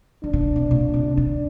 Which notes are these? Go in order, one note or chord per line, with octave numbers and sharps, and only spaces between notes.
D#3 D4
C3
D3
C3
A#2
C3
D3 D4